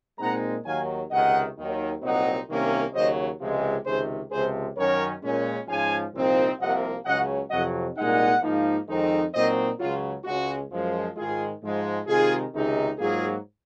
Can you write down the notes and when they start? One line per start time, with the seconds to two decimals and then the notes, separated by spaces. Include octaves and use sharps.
0.19 A#2 G#3 C4 D#4 F#5 A#5
0.65 D#2 D#3 F#3 F5 G#5
1.10 C#2 C3 D#3 D#5 F#5
1.57 D#2 D#3 F#3
2.02 C2 A#2 F#3 C4 D#4 D#5 F#5
2.48 C2 C3 D#3 A#3 C#4
2.93 D#2 C#3 F#3 C5 D#5
3.39 C#2 C3 F3 G#3
3.85 C#2 C3 D#3 G#4 C5
4.31 C#2 C3 F3 G#4 C5
4.76 F#2 D#3 F#3 C#4 A#4 C#5
5.22 A#2 G#3 C#4
5.67 G#2 F3 G#3 C#4 F5 G#5
6.13 C2 A#2 F3 C4 D#4
6.59 C2 C3 F3 A#3 D#5 F#5
7.05 C#2 C#3 F#3 C#4 D#5 F#5
7.50 F2 C3 F#3 D#5 F#5
7.96 C2 A#2 G#3 D#4 D#5 F#5
8.42 G#2 F3 A#3 D#4
8.87 F2 D#3 G#3 C4 D#4
9.33 A#2 F#3 C4 D#4 C5 D#5
9.79 C#2 C#3 F#3 F4
10.24 C#2 C#3 G#3 C#4 F#4
10.70 F#2 F3 G#3
11.16 G#2 D#3 G#3 F4 G#4
11.62 G#2 F3 G#3
12.07 C3 D#3 G#3 D#4 F4 G#4
12.53 C#2 C3 D#3 G#3 D#4
12.99 G#2 F#3 A#3 F4 G#4